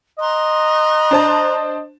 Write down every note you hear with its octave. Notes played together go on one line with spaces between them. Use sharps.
D#5 A#5 C6 F#6
D4 C5 A5